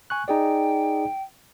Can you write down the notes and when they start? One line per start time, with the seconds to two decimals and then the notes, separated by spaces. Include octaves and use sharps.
0.10 G#5 C#6 F#6
0.28 D#4 G#4 D5 G5